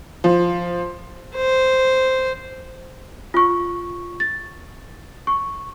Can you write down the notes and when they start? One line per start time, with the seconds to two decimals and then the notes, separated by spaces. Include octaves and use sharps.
0.24 F3
1.36 C5
3.34 F4 C#6
4.20 A6
5.27 C#6